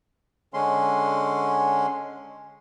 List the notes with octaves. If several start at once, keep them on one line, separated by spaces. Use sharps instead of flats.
D3 G#3 C#4 C6